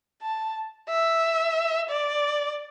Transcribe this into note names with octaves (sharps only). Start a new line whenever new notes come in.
A5
E5
D5